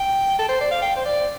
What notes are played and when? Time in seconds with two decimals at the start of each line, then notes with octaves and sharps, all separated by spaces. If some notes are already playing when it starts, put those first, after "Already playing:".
Already playing: G5
0.39 A4
0.49 C5
0.61 D5
0.71 F5
0.82 G5
0.96 C5
1.05 D5